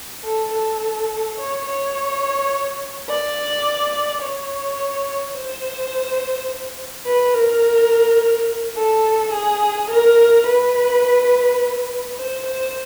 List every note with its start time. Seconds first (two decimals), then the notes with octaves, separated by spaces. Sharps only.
0.24 A4
0.51 A4
1.37 C#5
1.66 C#5
3.08 D5
4.22 C#5
5.34 C5
7.06 B4
7.33 A#4
8.76 A4
9.33 G#4
9.90 A#4
10.46 B4
12.17 C5
12.46 C5